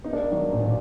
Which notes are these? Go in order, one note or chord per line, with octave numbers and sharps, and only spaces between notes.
B3 D#4
A#3 D4
D#3 F#3
A#2
A#2